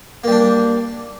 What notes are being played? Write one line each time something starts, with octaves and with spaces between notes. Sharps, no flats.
G3 A#3 D4